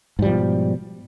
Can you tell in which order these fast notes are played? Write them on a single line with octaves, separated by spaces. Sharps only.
G#2 G3 F3 B2